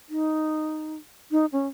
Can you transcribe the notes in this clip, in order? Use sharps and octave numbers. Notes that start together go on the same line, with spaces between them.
D#4
D#4
C#4